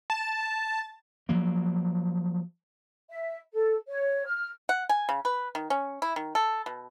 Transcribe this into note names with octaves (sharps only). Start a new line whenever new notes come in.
A5
F3 F#3 A#3
E5
A4
C#5
F6
F#5
G#5
C#3
B4
D#3
C#4
E4
D#3
A4
B2